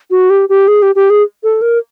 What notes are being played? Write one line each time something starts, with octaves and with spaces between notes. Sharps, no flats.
F#4
G4
G4
G#4
G4
G4
G#4
A4
A#4